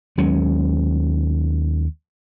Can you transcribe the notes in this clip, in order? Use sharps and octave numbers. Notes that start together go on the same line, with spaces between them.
D#2 F#3 G#3 C#4